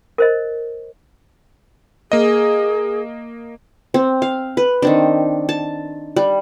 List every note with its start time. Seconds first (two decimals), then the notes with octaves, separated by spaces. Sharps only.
0.18 A#4 C5 D#5
2.12 A#3 G#4 D#5
3.94 C4
4.22 F5
4.57 B4
4.82 D#3 C4 D4
5.49 A5
6.16 G3